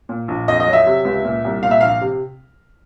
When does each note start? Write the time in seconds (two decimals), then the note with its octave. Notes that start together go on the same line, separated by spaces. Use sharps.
0.09 A#2
0.28 A#1
0.48 F2 D#5
0.60 D#5
0.67 F#3
0.73 E5
0.87 C3
1.05 C#2
1.25 A#2
1.45 C2
1.63 A#2 F5
1.71 E5
1.81 A#1 F5
2.01 C3